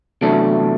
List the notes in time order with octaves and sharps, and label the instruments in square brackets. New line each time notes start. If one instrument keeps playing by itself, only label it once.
[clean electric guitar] E2 C3 F#3 A3 D4